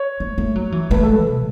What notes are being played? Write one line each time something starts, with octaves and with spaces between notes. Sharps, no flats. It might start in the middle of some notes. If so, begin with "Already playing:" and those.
Already playing: C#5
A3
A3
F#3
E3
A3 B4
A4
B4
B2